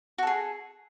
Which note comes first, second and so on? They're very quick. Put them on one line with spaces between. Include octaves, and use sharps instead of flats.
F#4 A4 G#4